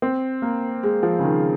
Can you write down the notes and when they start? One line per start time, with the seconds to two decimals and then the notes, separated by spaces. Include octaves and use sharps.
0.02 C4
0.42 A#3
0.83 G#3
1.03 F3
1.19 C#3
1.24 D#3